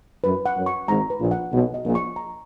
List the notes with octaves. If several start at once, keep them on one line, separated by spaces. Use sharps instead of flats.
F#2 B4
F#5
F#2
C#6
G#1 G#2 A#5
B4
A#1 A#2
F#5
B1 B2 G#4
D#5
A#1 A#2
C#6
A#5